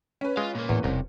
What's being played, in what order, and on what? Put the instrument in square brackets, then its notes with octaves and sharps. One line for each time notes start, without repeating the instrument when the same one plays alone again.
[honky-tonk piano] C#4 B4
[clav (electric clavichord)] G#3 [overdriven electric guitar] F4 F5
[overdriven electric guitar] A#2 A#3
[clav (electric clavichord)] E2 [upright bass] A2
[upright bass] E1 D#4 [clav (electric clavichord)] C2 [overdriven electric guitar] C3